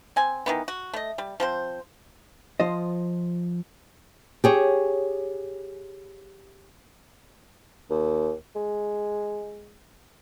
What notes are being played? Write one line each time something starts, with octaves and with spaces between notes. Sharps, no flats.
C4 G#5
D#3 E3 B3
F#4
A3 D#5
G3
F3 C4 C5
F3 F4 C5 D#5
G4 G#4 C#5
D#2
G#3